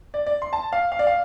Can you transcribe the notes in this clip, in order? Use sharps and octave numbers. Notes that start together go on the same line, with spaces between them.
D5
D5
C6
A5
F5
F5
D5
F5